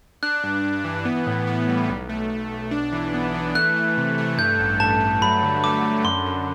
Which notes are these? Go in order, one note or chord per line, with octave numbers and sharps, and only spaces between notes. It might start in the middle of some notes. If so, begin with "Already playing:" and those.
D4 F#6
G2
G2
E3
B3
A2
B3
G3
B1
A3
B1
B1
D4
E3
B3
E3
A3 F#6
A3
C3
A3
G2 G6
A1
G2 A5
A3
F#3 B5
D3
A3 D6
D3
F#2 C6
F#2